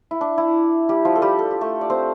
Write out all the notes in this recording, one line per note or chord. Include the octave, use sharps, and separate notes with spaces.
E4
D4
E4
G3 G4
F3 F4
A4
G3 G4
A4
G4
A3 A4
D5
C4 C5